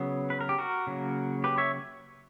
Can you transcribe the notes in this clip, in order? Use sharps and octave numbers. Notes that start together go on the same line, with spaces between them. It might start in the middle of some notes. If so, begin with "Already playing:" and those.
Already playing: C#3 F#3 B3
B4
A#4
G4
F#4 A#4
C#3 F#3 A#3
G4 B4
C#5 E5